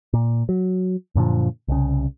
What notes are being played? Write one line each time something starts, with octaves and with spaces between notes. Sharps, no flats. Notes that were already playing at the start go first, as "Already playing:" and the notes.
A#2
F#3
F#2 A#2 D3 F3
C2 C#3